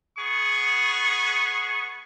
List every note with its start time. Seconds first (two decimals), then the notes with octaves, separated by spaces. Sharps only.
0.18 B3 G#4 C#6